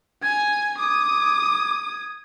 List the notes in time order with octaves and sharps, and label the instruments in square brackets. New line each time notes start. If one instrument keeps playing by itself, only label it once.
[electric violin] G#5 [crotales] G#6
[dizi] D6 [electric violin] D#6